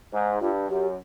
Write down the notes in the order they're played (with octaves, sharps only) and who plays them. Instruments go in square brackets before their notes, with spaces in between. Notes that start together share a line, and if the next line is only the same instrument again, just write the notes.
[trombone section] G#2
[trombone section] G2 [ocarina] F4
[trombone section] F#2 [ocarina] G4